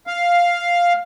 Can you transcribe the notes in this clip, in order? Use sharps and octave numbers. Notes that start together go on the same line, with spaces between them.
F5